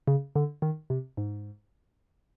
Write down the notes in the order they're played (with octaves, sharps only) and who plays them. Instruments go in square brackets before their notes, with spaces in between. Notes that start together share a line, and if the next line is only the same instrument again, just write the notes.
[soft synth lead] C#3
D3
D#3
C3
G#2